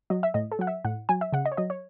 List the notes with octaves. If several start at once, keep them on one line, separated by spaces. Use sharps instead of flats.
F#3 D#5
E5
A2 D#5
A4
F#3 F#5
E5
A2 F#5
F#3 G#5
E5
C#3 F#5
D#5
C#5
F#3 D#5
C#5